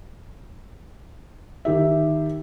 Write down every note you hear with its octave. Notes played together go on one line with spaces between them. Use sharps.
D#3 G4 E5